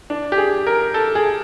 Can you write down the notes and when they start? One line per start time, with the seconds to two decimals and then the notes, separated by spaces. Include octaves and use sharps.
0.10 D4
0.32 G4
0.38 G#4
0.67 A#4
0.94 A4
1.15 G#4